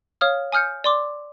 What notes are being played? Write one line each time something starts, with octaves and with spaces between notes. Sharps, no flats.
C#5 F5 D#6 F6
G#5 D#6 F6 G6 C#7
D5 C6 D6